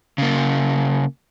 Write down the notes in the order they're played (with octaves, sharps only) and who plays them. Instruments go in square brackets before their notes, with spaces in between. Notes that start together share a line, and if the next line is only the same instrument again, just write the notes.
[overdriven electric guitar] C#3 A#3